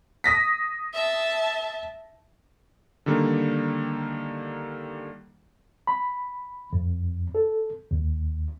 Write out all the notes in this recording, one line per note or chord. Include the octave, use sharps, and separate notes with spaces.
D#6 A#6 B6
E5 A5
D3 D#3 G3 A#3
B5
F2
A4
D#2